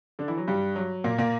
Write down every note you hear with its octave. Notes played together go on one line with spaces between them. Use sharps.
D3 D4
E3 E4
F#3
G2 G3
F#3
A#2 A#3
A#2 A#3